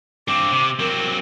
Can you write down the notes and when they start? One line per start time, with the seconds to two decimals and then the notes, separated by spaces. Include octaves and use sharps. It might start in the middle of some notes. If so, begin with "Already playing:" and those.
0.28 G2 C4 D6
0.52 C3
0.79 F#3 C4 A#4